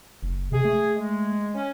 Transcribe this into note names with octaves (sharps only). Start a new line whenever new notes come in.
F#1
C3 G#4
A3
G#3
C#4